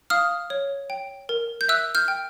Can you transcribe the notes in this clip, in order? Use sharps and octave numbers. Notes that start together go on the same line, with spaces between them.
F5 D#6 F6
C#5
G5
A#4
G6
E5 E6 F#6
F6 G6
G5